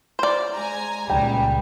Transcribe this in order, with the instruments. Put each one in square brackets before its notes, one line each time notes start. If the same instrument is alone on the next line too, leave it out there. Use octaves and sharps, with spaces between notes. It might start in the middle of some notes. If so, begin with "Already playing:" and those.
[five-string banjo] C5 D5
[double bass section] G#3 [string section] G#5 A#5
[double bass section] C#2 A#2 [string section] G3 [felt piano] G5